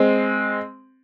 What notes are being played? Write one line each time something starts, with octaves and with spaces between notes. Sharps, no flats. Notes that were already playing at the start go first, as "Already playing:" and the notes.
Already playing: G#3 C4